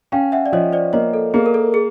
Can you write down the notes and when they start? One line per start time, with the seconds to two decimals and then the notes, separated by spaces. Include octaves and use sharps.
0.12 C#4 F5 G5
0.32 E5 F#5
0.46 D5
0.52 F3 C#5 D#5
0.73 C5 D5
0.93 A#3 C#5 D#5
1.14 A4
1.34 A#3 G#4
1.46 A#4
1.54 A4
1.74 G#4